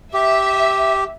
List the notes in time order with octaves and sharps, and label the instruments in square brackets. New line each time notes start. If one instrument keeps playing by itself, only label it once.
[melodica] G4 [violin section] E5